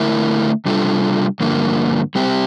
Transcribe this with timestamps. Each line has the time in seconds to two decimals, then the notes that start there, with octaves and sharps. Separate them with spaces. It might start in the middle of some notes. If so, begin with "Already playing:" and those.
Already playing: D3 A3 E4 A#4 E5
0.66 C3 G3 D4 F4 A4
1.40 G2 D3 F3 A#3
2.15 G3 C4 G4